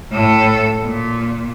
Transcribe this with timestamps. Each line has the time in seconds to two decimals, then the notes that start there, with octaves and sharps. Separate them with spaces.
0.12 A2 A4
0.85 A#2